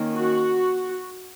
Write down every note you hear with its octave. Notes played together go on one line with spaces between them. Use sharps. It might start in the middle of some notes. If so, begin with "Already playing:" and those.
Already playing: D#3 A#3 C#4
F#4